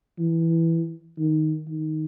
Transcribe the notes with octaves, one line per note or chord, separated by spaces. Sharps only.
E3
D#3
D#3